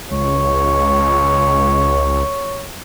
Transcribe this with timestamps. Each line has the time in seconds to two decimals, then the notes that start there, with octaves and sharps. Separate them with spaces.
0.11 C#2 C#5